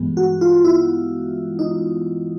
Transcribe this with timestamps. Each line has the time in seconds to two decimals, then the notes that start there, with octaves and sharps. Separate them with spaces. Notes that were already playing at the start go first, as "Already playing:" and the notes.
Already playing: G2 E3 G#3 B3
0.17 F#4
0.41 F4
0.65 E4
1.59 D#4